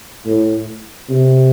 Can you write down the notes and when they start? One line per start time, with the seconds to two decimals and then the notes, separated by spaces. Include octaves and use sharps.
0.26 A2
1.10 C3